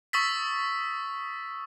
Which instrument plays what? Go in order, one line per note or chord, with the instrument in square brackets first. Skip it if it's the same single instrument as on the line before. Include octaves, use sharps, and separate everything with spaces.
[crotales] C#6 D#6 E6 A6 B6